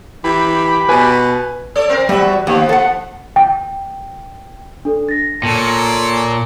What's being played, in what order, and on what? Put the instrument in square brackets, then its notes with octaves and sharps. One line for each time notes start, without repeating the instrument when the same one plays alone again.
[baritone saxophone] E3 [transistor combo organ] G4 B5
[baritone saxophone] B2 [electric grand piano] B4 G#5
[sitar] A4 C#5 D5
C4 A#4 C5
[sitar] E2 F#4 E5 [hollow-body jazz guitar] G3
[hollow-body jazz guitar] D#2 [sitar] F3 B3
[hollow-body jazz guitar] A4 F#5
[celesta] G5
D4 A4
A6 A#6
[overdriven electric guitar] A#2 [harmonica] A4 C#5